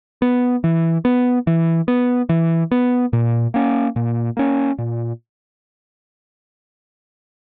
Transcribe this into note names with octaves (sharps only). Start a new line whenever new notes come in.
B3
E3
B3
E3
B3
E3
B3
A#2
A#3 C#4
A#2
A#3 C#4
A#2